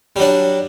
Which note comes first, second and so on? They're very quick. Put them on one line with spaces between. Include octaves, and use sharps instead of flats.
G3 F#3 D4